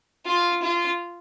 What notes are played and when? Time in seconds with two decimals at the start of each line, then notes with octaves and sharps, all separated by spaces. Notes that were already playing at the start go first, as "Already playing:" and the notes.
0.26 F4
0.62 F4